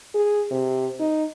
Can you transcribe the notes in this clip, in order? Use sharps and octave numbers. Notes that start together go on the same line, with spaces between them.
G#4
C3
D#4